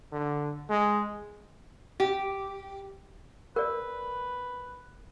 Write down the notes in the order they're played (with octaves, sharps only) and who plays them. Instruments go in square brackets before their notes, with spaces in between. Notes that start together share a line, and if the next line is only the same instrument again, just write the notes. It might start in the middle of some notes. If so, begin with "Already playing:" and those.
[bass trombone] D3
G#3
[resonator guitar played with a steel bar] G4
[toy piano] A#4 D5 [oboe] B4